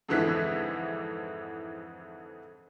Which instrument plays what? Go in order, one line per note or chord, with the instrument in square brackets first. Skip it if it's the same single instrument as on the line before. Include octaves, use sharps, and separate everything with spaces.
[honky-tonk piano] F2 G#2 D3 E3 F#6 B6